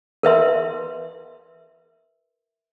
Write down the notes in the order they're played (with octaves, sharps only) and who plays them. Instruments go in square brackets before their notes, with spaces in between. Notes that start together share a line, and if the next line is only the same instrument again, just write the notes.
[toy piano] A#4 B4 E5 C6